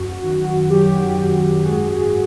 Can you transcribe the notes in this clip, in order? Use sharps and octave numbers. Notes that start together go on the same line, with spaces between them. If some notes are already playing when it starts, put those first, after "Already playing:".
Already playing: F#2 F#4
D#3 F#4
F#3 G4
F#2 G4
G#2 F#4 G#4